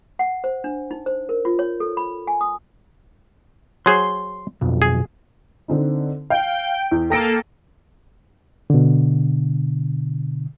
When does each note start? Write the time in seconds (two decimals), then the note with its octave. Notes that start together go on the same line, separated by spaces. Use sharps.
0.19 F#5
0.44 C5
0.64 D4
0.91 D#4
1.06 C5
1.29 A#4
1.45 F4
1.59 C#5
1.80 A4
1.97 B5
2.27 G#5
2.41 D#6
3.86 F#3 G#4 C5 C6
4.61 B1 F2
4.82 G#4
5.68 D3 C4 D#4
6.30 F5 G5
6.91 E2
7.10 A#3 A4 G5 A#6 D7
8.70 B2 D3